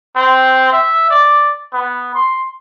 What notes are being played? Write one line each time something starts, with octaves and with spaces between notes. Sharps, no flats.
C4
E5
D5
B3
C6